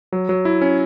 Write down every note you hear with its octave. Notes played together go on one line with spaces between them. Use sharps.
F#3
F#3
E4
C#4